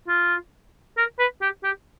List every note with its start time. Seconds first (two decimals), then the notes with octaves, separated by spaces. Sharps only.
0.08 F4
0.97 A#4
1.19 B4
1.41 G4
1.63 G4